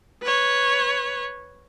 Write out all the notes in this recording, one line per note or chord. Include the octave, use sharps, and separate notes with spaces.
B4 C#5